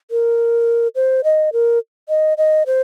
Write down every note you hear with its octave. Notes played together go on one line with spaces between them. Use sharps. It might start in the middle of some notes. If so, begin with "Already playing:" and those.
A#4
C5
D#5
A#4
D#5
D#5
C5